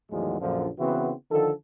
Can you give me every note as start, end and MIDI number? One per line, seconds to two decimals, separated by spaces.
0.11 0.38 40
0.11 0.38 45
0.11 0.38 51
0.11 0.38 53
0.11 0.38 54
0.11 0.38 56
0.40 0.68 34
0.40 0.68 42
0.40 0.68 46
0.40 0.68 50
0.40 0.68 53
0.79 1.12 49
0.79 1.12 52
0.79 1.12 59
0.79 1.12 60
0.79 1.12 64
0.79 1.12 66
1.31 1.51 50
1.31 1.51 51
1.31 1.51 53
1.31 1.51 69